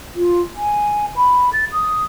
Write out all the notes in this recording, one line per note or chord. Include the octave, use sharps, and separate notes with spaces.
F4
G#5
B5
A6
D#6